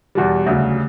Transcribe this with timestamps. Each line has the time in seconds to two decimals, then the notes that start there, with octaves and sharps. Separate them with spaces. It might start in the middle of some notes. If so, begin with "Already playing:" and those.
0.15 E2 B2 G3
0.47 D2 C#3 F#3